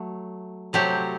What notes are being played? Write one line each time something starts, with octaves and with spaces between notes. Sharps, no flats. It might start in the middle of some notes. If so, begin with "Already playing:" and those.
Already playing: F#3 A3
C3 F#3 A3 C4 G4